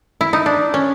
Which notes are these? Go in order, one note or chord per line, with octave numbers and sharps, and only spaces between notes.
E4
D#4
D4
C#4